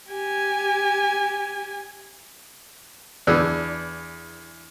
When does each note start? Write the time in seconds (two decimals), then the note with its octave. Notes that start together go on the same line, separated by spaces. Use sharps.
0.11 G4 G#5
3.27 E2 D4 G#4 B4 E6